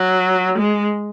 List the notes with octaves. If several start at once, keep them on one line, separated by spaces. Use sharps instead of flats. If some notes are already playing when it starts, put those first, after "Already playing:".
Already playing: F#3
G#3